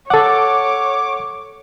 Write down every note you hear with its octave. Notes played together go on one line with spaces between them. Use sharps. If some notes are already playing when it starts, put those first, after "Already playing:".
A4 C#5 F#5 D6